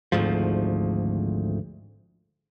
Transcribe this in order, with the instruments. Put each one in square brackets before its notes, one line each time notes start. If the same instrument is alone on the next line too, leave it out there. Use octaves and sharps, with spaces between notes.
[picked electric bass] G#1 D2 G#2 F3